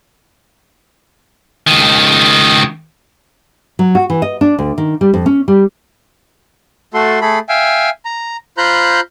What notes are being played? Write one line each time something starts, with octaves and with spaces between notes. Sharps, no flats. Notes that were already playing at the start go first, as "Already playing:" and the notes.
C#2 D#3
F#3
F#4
E3
D#5
D4
D2
D#3
G3
F2
C#4
G3
A3 F#4 A4 C6
A3 G#4 A4 B5
E5 F5 G5 G#5
A#5
F4 C5 A#5 B5 F#6 G6